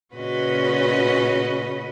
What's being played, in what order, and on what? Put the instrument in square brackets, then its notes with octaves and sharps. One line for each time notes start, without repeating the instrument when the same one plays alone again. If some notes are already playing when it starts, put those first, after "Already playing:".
[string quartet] A#2 C#3 C#4 F#4 B4 D#5